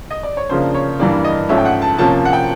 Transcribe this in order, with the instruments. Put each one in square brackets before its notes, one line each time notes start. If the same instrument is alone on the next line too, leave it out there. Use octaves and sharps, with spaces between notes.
[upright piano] D#5
D5
C#5
C#3 F3 A#3 D4 C5
C#5
G2 E3 G3 A#3 D5
D#5
G#2 F3 A3 C#4 E5
G5
F#5
A5
C3 F3 A#3 C#4 A5
F#5
G5